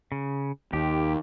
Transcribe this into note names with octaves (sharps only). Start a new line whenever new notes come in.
C#3
D#2 G4